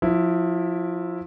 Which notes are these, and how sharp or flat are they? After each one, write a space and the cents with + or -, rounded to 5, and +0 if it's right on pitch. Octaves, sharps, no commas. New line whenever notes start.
F3 +25 E4 +0